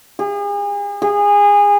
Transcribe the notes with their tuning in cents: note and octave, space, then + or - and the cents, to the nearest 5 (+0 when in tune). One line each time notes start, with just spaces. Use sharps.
G#4 -40
G#4 -25